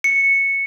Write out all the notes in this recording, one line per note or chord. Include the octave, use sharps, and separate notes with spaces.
C#7